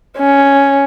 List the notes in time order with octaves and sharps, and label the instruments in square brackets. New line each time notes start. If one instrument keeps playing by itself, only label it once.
[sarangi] C#4